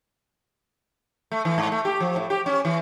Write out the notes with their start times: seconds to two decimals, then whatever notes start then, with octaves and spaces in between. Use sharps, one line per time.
1.31 A3
1.45 E3
1.58 G#2
1.72 A3
1.85 G4
2.00 F3
2.16 A2
2.30 G4
2.46 C#4
2.65 E3